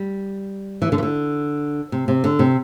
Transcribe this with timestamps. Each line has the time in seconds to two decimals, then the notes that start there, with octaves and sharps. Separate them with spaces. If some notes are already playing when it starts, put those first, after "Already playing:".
Already playing: G3
0.82 E3
0.92 D3
0.98 E3
1.03 D3
1.92 C3
2.08 C3
2.24 D3
2.39 C3